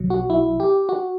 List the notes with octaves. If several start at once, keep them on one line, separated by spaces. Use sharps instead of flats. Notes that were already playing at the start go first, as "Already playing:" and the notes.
Already playing: B1 B2 F#3
F#4
E4
G4
F#4